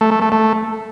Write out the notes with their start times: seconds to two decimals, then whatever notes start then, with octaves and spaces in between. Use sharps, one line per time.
0.01 A3
0.11 A3
0.22 A3
0.32 A3